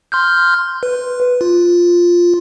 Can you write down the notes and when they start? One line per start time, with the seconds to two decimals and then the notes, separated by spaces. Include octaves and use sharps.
0.12 C6 F6 G6
0.83 B4
1.41 F4